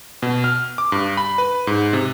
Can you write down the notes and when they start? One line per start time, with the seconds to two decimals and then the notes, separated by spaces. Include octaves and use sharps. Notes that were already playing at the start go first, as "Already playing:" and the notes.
0.22 B2
0.44 F6
0.78 D6
0.92 G2
1.17 B5
1.38 B4
1.67 G#2
1.93 C3